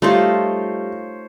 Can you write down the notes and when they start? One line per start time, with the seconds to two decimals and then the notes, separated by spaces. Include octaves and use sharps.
0.02 G3 A3 D#4 F4 C5 C#5